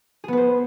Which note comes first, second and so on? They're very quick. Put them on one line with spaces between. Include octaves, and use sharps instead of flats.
G#4 B3 B4 C5